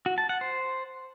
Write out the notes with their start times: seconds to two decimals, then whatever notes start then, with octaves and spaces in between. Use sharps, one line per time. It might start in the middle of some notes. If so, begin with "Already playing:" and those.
0.06 F#4
0.18 A5
0.29 F#5
0.41 C5